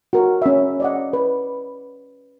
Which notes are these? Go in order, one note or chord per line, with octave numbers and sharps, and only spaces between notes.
F#4 A#4
C#4 E5
D5 D#5 F#5
B4